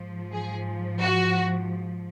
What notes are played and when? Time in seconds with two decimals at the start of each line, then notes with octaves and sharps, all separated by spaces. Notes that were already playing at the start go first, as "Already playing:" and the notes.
Already playing: G#2 F3
0.32 G#4
1.01 F#4